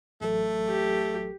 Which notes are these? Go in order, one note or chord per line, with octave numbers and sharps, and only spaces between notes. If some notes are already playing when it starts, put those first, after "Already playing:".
A1 F#3 A3 A4
G4